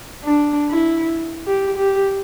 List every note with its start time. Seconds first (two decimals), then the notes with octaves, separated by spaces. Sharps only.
0.24 D4
0.70 E4
1.47 G4
1.78 G4